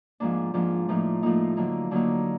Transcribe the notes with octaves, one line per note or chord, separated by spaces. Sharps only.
G#2 F3 A#3 D4
G#2 F3 A#3 D4
A2 F3 A#3 D#4
A2 F3 A#3 D#4
D3 F#3 A#3 D#4
D3 F#3 A#3 D#4